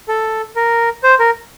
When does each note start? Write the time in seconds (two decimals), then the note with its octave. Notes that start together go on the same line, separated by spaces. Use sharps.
0.08 A4
0.56 A#4
1.04 C5
1.19 A#4